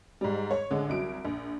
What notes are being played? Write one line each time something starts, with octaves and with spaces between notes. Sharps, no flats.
G#2 G3
C#5
A1 D3 G#3
C2 F#3 D7
A#1